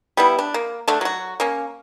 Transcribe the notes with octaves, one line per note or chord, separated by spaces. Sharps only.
G3 B3 E4
D4
A#3
D3 A3 D4
F#3 F#4
A#3 C#4